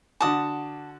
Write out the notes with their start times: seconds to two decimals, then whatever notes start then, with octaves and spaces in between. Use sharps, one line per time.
0.21 D3 F#4 A5 D6 D#6